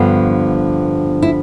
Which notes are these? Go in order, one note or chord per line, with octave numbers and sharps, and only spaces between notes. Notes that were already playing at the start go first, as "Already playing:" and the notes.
Already playing: G2 D3 F3 B3
E4